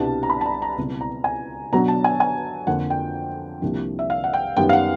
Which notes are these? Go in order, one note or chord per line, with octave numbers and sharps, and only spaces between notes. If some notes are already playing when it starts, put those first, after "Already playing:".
Already playing: C2 B2 G3 B3 D4 A5
A#5
B5
A5
A#5
A#5
C#2 B2 G3 C4 E4
A#5
G#5
B2 F#3 B3 D4 A#5
A5
G#5
G#5
F2 D3 F3 A#3 F#5
G5
C2 C3 F3 A#3 D4
E5
F5
F#5
G5
F#2 D#3 G3 B3 G5
F5
F#5